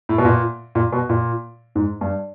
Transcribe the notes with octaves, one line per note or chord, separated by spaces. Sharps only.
A2
B2
A#2
A#2
B2
A#2
G#2
G2